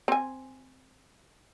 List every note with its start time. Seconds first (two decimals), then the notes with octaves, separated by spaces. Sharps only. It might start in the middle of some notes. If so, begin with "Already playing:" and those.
0.08 C4 G#5